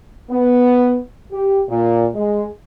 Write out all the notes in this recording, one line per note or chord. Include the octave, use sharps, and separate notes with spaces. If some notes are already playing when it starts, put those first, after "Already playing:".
B3
G4
A#2
G#3